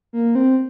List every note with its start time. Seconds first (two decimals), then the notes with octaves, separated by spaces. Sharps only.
0.13 A#3
0.35 C4